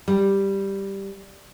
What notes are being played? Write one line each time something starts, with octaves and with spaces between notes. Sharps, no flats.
G3